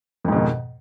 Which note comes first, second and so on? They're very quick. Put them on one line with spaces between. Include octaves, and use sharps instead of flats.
F2 G#2 B2 D#3